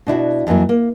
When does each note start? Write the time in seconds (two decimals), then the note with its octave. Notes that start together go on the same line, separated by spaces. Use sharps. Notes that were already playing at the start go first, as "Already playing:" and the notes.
0.07 B2 D4 E4 F#4
0.47 F2 E3 F#3 A#3 E4
0.69 A#3